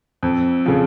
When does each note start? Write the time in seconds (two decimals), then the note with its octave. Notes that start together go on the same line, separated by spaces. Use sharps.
0.23 F2
0.66 C#3 F3